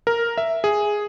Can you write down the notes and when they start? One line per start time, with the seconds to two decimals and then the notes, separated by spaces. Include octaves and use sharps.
0.07 A#4
0.38 E5
0.64 G#4